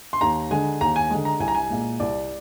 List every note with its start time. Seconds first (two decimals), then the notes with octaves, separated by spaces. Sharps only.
0.13 C6
0.21 D#2 A#5
0.51 D3 G#3 G#5
0.81 D#2 A#5
0.96 G#5
1.11 D3 G#3
1.25 A#5
1.40 C2 G#5
1.48 A#5
1.55 G#5
1.70 A#2 G#3
2.00 C2 D5